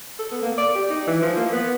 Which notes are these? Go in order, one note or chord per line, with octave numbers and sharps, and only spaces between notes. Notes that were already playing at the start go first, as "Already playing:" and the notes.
A4
B3
A#3
D5
G4
D#4
E3
F3
A#3
B3